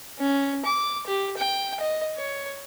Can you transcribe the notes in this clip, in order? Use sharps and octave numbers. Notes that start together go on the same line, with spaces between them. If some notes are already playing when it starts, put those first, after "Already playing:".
C#4
D6
G4
G5
D#5
C#5